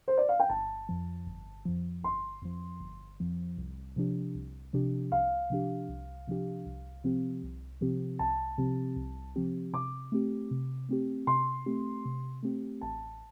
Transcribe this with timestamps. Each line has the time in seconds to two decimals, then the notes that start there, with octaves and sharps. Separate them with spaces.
0.08 C5
0.18 D5
0.29 F5
0.40 G5
0.49 G1 A5
0.89 F2 F3
1.27 G1
1.65 F2 F3
2.04 G1 C6
2.42 F2 F3
2.81 G1
3.20 F2 F3
3.58 C2
3.96 C3 F3 D4 G4
4.35 C2
4.73 C3 F3 D4 G4
5.12 C2 F5
5.50 C3 F3 D4 G4
5.89 C2
6.27 C3 F3 D4 G4
6.66 C2
7.04 C3 F3 C4 G4
7.43 C2
7.81 C3 F3 C4 G4
8.19 C2 A5
8.58 C3 F3 C4 G4
8.96 C2
9.36 C3 F3 C4 G4
9.73 C3 D6
10.12 A3 C4 G4
10.51 C3
10.89 A3 C4 G4
11.27 C3 C6
11.66 A3 C4 G4
12.05 C3
12.43 A3 C4 G4
12.81 A1 A5